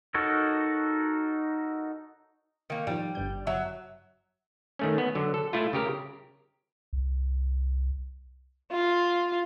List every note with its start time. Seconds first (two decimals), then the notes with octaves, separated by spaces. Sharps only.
0.14 D#4 F#4 A4 A#4 C#5
2.70 D#3 A#3
2.87 G#2 D#3 F3 G3
3.15 G1 G2 G6
3.47 G1 F#3 C#5 E5
4.79 D#3 A3 C#4
4.98 B3
5.15 D3 F#3
5.34 A4
5.53 A3 E4 F4
5.73 C#3 G4 A#4
6.93 C2
8.72 F4